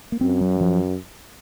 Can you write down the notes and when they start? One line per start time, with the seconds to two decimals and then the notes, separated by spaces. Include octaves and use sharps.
0.12 A#3
0.21 F#2 C4
0.41 F#3
0.61 F3